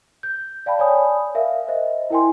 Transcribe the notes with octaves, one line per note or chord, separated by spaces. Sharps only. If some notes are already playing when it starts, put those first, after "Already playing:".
G6
D5 F5 G5 A5 B5
C#5 D5 G#5 B5 D#6
A#4 E5 F5
C5 D#5 E5
E4 A#4 G5 G#5 C6